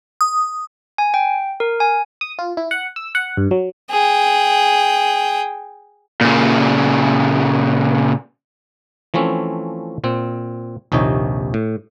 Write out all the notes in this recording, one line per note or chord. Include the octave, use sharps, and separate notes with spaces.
D#6
G#5
G5
A#4
G#5
D#6
F4
E4
F#5
E6
F#5
G2
F#3
G#4 G5
A#2 C#3
E3 F3 A3 C4 C#4
A#2 C4
A#1 D#2 C3 D#4 C#5
A2